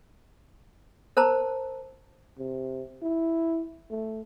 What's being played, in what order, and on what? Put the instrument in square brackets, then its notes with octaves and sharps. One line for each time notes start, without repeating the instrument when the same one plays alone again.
[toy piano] A#4 C5 A5 A#5
[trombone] C3
E4
A3